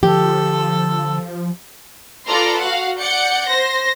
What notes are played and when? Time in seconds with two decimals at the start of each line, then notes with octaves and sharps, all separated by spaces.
0.03 D3 F3 G4 A4
2.27 F4 A4 B4 D5 A#5 C6
2.60 F#4 F5 F#5
2.99 D5 F#5 G6 C#7
3.47 C5 A#6